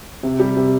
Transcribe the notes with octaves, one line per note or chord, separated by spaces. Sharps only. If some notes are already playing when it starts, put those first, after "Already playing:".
C3
G3
C3